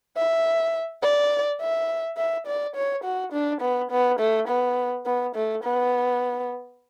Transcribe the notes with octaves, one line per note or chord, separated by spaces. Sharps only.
E5
D5
E5
E5
D5
C#5
F#4
D4
B3
B3
A3
B3
B3
A3
B3